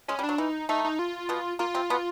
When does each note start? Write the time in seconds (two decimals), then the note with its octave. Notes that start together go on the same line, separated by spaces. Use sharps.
0.08 G#3 C#4
0.19 G3
0.23 D4
0.29 F#3
0.38 E3 D#4
0.69 A3 D#4
0.85 D#4
0.99 F4
1.29 B2 B3
1.59 A#3 F4
1.75 C3 C4
1.90 B2 B3